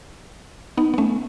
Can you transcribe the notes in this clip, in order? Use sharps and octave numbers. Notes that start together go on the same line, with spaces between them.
B3 D#4
B3
A3 C#4